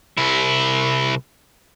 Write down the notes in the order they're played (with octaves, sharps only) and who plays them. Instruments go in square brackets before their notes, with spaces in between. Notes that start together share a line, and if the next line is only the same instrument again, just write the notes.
[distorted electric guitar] C2 E4